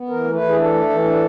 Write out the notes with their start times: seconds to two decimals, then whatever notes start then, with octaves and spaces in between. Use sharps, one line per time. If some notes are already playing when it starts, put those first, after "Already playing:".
Already playing: B3
0.09 E3 A#4
0.24 A3
0.33 B4
0.41 E3
0.49 G#4
0.56 D4 A4
0.73 A3
0.90 E3
1.04 D4